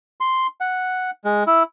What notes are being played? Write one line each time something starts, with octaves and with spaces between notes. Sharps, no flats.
C6
F#5
G#3
E4